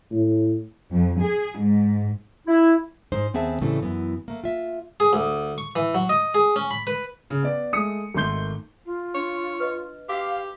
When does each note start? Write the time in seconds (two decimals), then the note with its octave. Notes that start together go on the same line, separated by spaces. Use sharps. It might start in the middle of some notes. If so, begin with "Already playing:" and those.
0.11 A2
0.93 F2
1.23 G#4
1.59 G#2
2.47 E4
3.12 G#2 D#4 C5
3.34 D#2 B3 C4 G#4 E5 A5
3.61 A2 C#3 E3 G3 A3 C4
3.82 F#2 E3 B3
4.28 A3 A#3
4.44 F4 E5
5.00 G#4
5.13 D2
5.58 C#6
5.76 E3
5.95 F#3
6.09 D#5
6.34 G#4
6.56 C#4
6.71 B5
6.87 B4
7.30 C#3
7.43 B3 D5
7.73 G#3 A3 D#6 C#7
8.14 G#1 D#3 A3 C6 G6 G7
8.86 F4
9.15 D4 C#5
9.60 B4 D#5
10.09 F#4 G4 F5 D6 E6